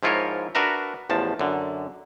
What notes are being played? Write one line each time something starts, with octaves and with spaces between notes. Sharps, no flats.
G#2 F3 E4 F4 A#4 C#5
D4 F#4 A#4 B4 E5 A#5
A1 E2 F3 A5
F#2 D3